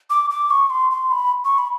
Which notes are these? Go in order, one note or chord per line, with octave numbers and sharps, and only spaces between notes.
D6
D6
C#6
C6
C6
B5
C#6
B5